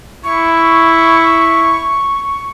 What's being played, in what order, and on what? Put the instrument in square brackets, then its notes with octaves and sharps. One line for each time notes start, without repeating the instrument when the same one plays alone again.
[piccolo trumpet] E4 [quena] C#6